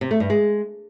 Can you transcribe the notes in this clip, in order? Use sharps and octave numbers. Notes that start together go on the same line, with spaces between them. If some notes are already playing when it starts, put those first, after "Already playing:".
C3
A3
G2
G#3